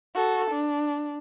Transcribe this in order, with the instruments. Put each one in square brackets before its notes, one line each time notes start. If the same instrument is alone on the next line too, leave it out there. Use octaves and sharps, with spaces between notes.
[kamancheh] F#4 A4
D4